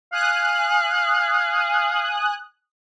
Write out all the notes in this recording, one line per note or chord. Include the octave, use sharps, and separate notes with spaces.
F5 G#5 D#6 F#6